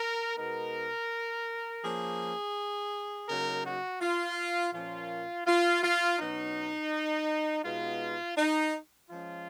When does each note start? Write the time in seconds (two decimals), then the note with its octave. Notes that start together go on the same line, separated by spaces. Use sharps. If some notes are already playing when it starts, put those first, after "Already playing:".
Already playing: A#4
0.37 B2 G#3 B3 D#4 A#4
1.82 F3 A#3 C#4 G#4
3.28 C#3 F#3 A#3 D#4 A#4
3.64 F#4
4.01 F4
4.73 A#2 F3 A#3 C#4 F4
5.46 F4
5.83 F4
6.19 B2 F#3 C#4 D#4
7.64 B2 G#3 B3 D#4 F4
8.37 D#4
9.09 F3 G#3 C#4 F4